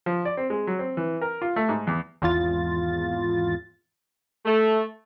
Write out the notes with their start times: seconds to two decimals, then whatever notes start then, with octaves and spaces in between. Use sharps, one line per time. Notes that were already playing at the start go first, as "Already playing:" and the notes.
0.06 F3
0.25 D5
0.37 C4
0.50 G#3
0.67 F#3
0.79 C4
0.97 E3
1.21 A#4
1.42 F4
1.56 A3
1.69 G#2
1.87 E2
2.22 G#1 E2 F4 A6
4.45 A3